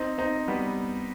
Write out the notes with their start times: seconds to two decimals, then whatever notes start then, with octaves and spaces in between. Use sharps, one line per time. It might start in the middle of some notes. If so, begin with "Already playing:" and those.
Already playing: C4 D#4
0.18 C4 D#4
0.48 G3 B3